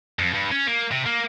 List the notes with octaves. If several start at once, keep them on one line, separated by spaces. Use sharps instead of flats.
F2
G2
C#4
A#3
C3
A#3